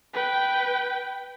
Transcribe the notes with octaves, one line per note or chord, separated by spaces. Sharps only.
B4 G5